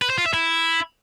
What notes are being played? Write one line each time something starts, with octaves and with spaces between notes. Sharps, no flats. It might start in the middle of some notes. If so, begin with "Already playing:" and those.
B4
C5
F4
E5
E4